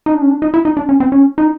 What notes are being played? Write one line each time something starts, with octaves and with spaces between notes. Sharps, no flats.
D#4
D4
C#4
D4
D#4
E4
D#4
D4
C#4
C4
C#4
D#4